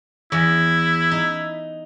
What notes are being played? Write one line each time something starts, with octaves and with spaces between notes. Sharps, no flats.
E2 E4
D#4